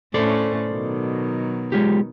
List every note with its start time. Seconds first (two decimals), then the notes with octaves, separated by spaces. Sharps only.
0.14 A2 A3 C#4 A4 C5 D5
0.69 B2 D#3 F#3
1.72 G#3 F4 G4